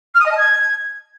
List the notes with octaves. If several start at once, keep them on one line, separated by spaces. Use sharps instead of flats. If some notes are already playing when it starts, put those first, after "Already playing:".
F6
D#6
D#5
A5
G#6